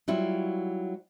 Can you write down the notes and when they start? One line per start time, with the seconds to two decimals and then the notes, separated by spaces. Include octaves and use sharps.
0.08 F#3 G3 E4 F4